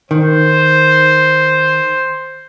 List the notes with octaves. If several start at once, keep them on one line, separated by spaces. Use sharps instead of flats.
D#3 C5